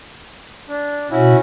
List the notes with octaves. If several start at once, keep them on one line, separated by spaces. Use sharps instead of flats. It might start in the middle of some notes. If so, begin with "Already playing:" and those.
D4
B2 C#4 E4 F#4